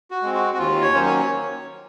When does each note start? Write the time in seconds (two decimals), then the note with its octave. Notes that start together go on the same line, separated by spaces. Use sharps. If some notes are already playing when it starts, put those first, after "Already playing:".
0.11 F#4
0.22 G#3 C4
0.35 F#4
0.54 F#4
0.58 D#2 F4
0.82 C#5
0.93 D#3 F#3 A#3 C#4 C5
1.06 C#5